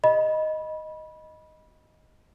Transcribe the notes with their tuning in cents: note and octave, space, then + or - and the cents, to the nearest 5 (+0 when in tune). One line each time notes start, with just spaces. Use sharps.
D#5 +0 B5 -20